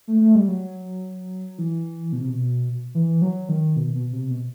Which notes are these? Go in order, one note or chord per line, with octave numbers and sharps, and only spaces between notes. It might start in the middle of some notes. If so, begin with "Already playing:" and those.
A3
A3
G3
F#3
E3
B2
C3
B2
E3
F#3
D#3
B2
B2
C3
B2